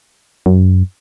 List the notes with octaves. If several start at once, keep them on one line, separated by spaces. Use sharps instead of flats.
F#2